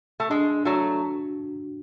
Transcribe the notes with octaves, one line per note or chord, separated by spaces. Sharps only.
A3
G#3 D4
F#3 A3 F#4